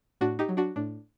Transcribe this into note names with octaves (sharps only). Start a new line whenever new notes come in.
A2 D4 F#4
D#4 G4
F#3
D4 F#4
A2 D4